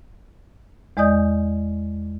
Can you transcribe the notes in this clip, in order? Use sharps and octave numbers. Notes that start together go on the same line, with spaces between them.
E2 G#3 D5 D#5 D#6 G6